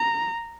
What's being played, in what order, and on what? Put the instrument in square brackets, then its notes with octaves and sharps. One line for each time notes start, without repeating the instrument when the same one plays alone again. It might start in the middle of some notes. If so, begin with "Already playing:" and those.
Already playing: [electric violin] A#5